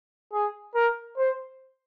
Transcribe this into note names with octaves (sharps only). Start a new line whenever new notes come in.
G#4
A#4
C5